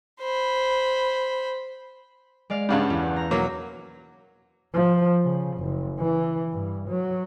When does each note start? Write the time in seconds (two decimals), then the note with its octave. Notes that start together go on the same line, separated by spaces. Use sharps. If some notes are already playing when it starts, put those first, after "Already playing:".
0.21 C5 B5
2.50 G#3 D5 F5
2.69 G2 C#3 G3 F5 F#5 A5
2.90 E2
3.16 A#5
3.31 B2 F#3 A#3
4.74 F3
5.24 C#3
5.58 F#1
5.99 E3
6.52 G2
6.89 F#3